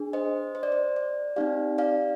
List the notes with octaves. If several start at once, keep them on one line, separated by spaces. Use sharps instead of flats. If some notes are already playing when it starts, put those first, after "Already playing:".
Already playing: D4 G#4
C5 D#5
C5
D5
C5
D5
C4 D#4 G4 D5 F5
D5 F5